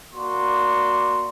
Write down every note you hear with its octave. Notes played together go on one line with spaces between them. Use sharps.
A#3 F#4 D5 C6